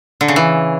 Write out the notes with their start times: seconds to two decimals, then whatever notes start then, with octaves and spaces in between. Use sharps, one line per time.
0.21 D3
0.28 C#3
0.36 E3